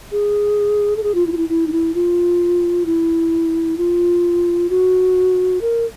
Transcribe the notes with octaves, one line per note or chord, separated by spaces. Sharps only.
G#4
A4
G#4
F4
E4
F4
E4
E4
D#4
E4
F4
E4
F4
F#4
A#4